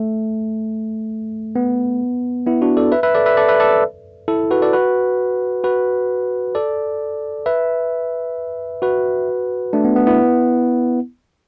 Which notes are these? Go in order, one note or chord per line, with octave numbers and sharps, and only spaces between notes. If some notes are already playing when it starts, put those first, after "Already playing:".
Already playing: A3
B3
B3 E4
D4 F#4
A4 D5
B4 E5
B4 E5
A4 D5
B4 E5
A4 D5
B4 E5
A4 D5
E4 A4
F#4 B4
A4 D5
F#4 B4
F#4 B4
A4 D5
B4 E5
F#4 B4
A3 D4
B3
B3
B3 E4